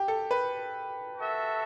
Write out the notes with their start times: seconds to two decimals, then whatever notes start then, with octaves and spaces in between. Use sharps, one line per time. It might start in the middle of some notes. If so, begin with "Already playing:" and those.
Already playing: G4
0.08 A4
0.31 B4
1.18 F#4 A4 E5